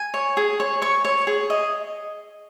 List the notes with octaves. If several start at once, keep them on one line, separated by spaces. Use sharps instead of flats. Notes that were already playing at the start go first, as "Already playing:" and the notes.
Already playing: G#5
C#5
G#4
C#5
C#5 C#6
C#5
G#4
D#5